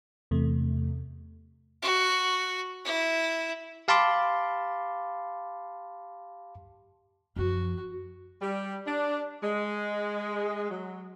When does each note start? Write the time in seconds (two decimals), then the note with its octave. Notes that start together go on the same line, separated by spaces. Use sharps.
0.31 E2 C3 A3
1.83 F#4
2.85 E4
3.88 G4 F5 A5 B5 C6 D6
7.36 F#2 F3 F#4
8.41 G3
8.87 D4
9.43 G#3
10.70 F#3